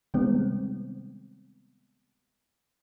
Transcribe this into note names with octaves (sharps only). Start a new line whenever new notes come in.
C3 D#3 G3 G#3 B3 C4